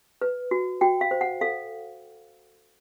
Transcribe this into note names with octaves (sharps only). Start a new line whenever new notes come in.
B4
F#4
F#4 G5
F5
C5
F#5
A4 F5